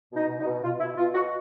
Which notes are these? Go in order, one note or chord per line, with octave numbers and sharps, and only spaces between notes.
B2
D#4
B2
D#4
B2
B2 F4
B2 E4
B2 F4
B2 F#4